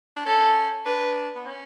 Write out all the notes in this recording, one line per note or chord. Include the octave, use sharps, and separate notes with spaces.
D4
C#4 A4
D4 B4
B3
C#4